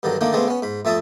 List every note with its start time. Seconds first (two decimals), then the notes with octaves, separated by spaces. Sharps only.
0.03 G2 D3 D#3 F#3
0.21 D3 D#3 A3 A#3 D4 D#4
0.33 C#3 G#3 A3 B3 C4 D4
0.48 B3 C#4
0.62 G#2 B5
0.85 F2 A3 E5 A5 D#6